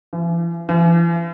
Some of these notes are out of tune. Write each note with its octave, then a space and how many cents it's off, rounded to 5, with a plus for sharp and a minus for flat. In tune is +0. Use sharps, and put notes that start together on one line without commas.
E3 +45
E3 +45